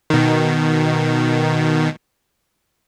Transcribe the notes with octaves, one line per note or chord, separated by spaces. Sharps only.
B2 D#3